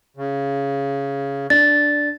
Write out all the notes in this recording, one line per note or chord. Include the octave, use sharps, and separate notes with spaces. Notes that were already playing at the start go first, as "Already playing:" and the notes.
C#3
D4 A6